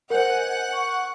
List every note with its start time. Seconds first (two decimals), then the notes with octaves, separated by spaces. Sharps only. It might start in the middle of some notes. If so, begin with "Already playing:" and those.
0.10 A#4 C5 D#5 F#5 G#5 G6
0.73 C#6